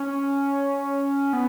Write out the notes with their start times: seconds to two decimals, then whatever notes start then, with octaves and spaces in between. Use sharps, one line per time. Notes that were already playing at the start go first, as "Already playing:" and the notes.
Already playing: C#4
1.33 B3